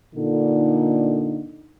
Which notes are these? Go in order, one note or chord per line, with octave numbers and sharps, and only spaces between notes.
A#2 D3 D#4